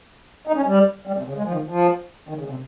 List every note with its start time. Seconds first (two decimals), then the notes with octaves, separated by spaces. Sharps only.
0.47 D#4
0.56 C#4
0.67 G3
1.07 G3
1.18 C3
1.28 C#3
1.38 G#3
1.45 F3
1.53 D#3
1.69 F3
2.29 D#3
2.39 C#3
2.50 C3